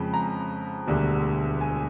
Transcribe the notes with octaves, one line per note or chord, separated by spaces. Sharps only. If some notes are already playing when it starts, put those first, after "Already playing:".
Already playing: F2 C#3 F3 G#3 B5
A#5
E1 D2 D3 G3
G#5